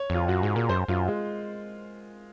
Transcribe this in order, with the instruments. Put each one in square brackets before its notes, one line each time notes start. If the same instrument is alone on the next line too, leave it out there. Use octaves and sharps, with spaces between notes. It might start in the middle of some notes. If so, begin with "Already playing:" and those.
Already playing: [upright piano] C#5
[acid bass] F2 [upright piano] F4
[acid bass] F#2 [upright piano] F#4
[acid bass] G#2 [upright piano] G#4
[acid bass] A#2 [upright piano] A#4
[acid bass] F#2 [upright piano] C5
[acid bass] F#2 [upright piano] F4
[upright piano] G#3